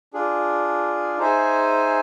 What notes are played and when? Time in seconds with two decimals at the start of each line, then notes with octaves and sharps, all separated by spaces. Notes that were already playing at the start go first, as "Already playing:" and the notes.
0.13 D4 F4 G#4
1.18 D#4 G#4 C5 E5 G#5